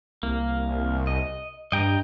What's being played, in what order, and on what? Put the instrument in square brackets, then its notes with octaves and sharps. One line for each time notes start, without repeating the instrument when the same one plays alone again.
[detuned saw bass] C2 [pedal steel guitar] A#3
[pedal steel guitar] D#5
[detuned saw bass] G2 [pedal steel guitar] D#5 G5 A#5